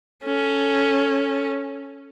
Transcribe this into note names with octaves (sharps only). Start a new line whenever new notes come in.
C#4 A4